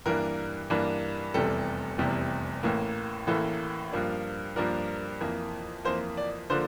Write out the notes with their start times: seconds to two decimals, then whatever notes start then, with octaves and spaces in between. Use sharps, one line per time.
0.06 G2 E3 A#3 D4 A#4
0.70 G2 E3 A#3 D4
1.34 F1 E2 C3 G3 A4
1.98 F1 E2 C3 G3
2.63 A1 A2 E3 A#3
3.27 A1 A2 E3 A#3 A4
3.92 G2 F3 A#3 D4
4.56 G2 F3 A#3 D4 A#4
5.21 F2 E3 A#3
5.85 F2 E3 A#3 C5
6.17 D5
6.50 D3 F3 A#3 D4 C5